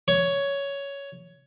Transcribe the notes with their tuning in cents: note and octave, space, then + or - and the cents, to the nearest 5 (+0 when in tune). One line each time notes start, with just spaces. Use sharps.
C#5 +10